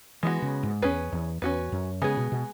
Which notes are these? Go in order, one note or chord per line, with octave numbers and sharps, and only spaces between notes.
E3 G#3 B3 F#4
C#3
G#2
E2 C#4 G#4 B4
E2
E2 C#4 F#4 B4
F#2
C#3 G#3 B3 G#4
B2
B2